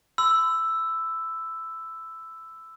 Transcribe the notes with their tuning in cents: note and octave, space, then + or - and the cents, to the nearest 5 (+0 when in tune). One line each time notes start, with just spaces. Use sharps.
B5 +45 E6 +0